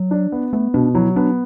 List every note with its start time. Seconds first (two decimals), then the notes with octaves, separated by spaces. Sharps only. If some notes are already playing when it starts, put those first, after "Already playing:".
Already playing: F#3
0.11 D4
0.32 B3
0.53 A3 B3
0.74 B2 D4
0.95 F#3 E4
1.16 B3 D4